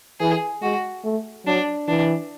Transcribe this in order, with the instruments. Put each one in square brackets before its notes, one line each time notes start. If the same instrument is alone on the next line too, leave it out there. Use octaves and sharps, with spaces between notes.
[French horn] E3 [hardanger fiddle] G#4
[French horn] G#3 [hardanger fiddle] F#4
[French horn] A3
[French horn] F#3 [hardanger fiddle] D4
[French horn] E3 [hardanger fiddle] D4